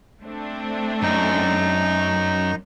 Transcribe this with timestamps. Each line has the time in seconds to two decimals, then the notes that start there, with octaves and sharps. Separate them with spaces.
0.22 A3 C4 D4
1.03 F#2 D#4